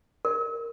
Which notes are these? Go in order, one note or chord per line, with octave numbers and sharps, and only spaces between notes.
A#4